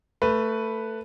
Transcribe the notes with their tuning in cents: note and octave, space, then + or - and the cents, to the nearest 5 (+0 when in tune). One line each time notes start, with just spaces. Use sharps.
A3 +15 B4 +0